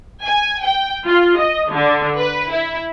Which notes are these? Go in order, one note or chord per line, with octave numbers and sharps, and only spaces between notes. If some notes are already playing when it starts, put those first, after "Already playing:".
G#5
G5
F4
D#5
D3
B4
E4